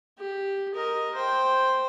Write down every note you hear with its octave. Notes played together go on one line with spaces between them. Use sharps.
G4
A#4 D#5
C5 G5